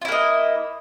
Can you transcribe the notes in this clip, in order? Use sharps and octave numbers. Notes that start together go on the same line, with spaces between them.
A#3 E4 F4 D#5